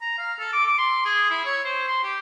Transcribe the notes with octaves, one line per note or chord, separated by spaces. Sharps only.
A#5
F5
A4
D6
D6
C6
G#4
E4
C#5
C5
C6
G4